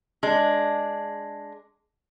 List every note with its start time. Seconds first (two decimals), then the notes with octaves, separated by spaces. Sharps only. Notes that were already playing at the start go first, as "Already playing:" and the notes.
0.23 G#3 D4